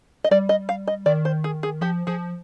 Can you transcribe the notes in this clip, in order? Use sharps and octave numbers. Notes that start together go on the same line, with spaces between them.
D#5
G3 D5
D#5
F5
D#5
D#3 D5
C5
G#4
G#4
F3 G4
F3 G#4